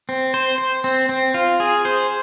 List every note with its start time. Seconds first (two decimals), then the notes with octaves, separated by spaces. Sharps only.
0.09 C4
0.34 C5
0.58 C5
0.84 C4
1.09 C4
1.34 F4
1.60 G#4
1.85 C5